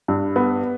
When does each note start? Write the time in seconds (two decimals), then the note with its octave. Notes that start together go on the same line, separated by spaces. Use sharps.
0.08 G2
0.36 B3